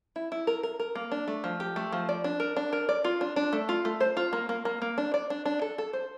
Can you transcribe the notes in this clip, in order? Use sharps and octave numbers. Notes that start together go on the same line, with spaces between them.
E4
E4
A#4
A#4
A#4
A#3
D4
A3
F3
G4
A3
F3
D5
D4
A#4
D4
A#4
D5
F4
D4
D4
A3
F4
A3
C5
F4
A#3
A#3
A#3
A#3
D4
D5
D4
D4
A4
A4
C5